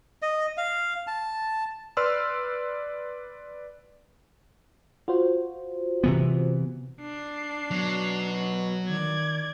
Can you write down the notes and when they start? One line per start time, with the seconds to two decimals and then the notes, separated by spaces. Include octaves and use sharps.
0.22 D#5
0.57 F5
1.07 A5
1.97 B4 D5 C6 E6 F6
5.08 F4 F#4 C5
6.04 C3 E3 B3
7.01 D4 C7
7.71 B2 F#3
8.89 D#3 D5 G#6